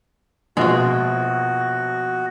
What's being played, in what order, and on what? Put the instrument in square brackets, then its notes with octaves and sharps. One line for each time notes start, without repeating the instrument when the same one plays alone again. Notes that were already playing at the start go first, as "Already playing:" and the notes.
[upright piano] A#1 B2 [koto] G#3 F4 [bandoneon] F#4